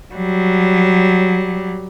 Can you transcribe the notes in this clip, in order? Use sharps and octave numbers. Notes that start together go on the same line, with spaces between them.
F#3 G3